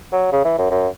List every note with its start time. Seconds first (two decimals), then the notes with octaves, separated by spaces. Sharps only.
0.12 F#3
0.32 C#3
0.45 E3
0.58 F#2
0.71 F#2